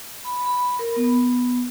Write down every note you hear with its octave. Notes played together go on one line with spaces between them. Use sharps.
B5
B5
A#4
B3